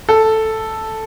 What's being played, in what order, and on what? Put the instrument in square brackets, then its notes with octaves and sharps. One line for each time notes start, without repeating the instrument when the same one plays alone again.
[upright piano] A4